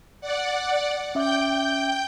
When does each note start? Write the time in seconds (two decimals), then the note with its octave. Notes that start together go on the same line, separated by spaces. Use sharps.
0.21 D5 F#5
1.15 C#4 E5 G5 D6 G6